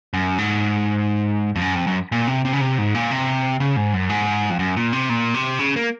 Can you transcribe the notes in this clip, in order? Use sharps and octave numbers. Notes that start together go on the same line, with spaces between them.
F#2
G#2
F2
F#2
F2
F#2
A#2
C3
C3
C#3
C3
G#2
A#2
C3
C#3
G#2
F#2
G#2
F2
F#2
A#2
C3
A#2
C3
C#3
A#3